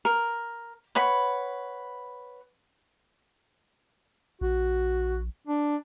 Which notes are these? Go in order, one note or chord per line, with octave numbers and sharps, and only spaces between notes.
A#4
B4 C#5 F#5 B5
A#1 F#4
D4